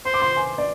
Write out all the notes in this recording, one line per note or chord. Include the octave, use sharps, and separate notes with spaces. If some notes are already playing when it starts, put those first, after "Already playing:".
C5 C6
D6
C6
G#5
D5